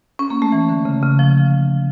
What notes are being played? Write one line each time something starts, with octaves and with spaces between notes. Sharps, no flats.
C#4
A#3
A3
E3
D3
C#3
C#3
F3